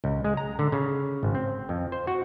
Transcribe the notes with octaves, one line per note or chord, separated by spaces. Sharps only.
C#2
G#3
A#5
D3
C#3
G#1
C4
F2
C5
F#4